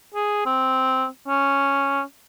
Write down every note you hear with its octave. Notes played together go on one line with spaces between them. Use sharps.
G#4
C4
C#4